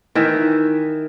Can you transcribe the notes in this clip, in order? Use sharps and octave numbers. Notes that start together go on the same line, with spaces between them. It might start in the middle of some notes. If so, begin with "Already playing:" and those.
D#3 E3 E5